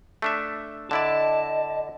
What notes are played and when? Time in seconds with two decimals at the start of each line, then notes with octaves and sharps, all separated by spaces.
0.22 A3 D4 E5
0.91 D3 E4 D5 D#5 A5